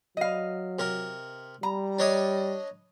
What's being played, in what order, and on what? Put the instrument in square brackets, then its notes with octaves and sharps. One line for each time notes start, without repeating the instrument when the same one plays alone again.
[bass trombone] F#3 [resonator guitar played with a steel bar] D#5 F5
[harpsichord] C3 A#4
[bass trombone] G3 [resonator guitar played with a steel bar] A#5
[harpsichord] D4 C#5 D#5